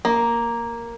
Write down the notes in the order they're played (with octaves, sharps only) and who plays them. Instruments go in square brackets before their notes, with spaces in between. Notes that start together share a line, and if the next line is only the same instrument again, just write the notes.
[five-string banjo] A#3